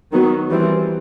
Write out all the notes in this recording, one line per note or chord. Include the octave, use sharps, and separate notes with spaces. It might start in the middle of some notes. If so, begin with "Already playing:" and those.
D#3 F#3 B3
E3 G3 C4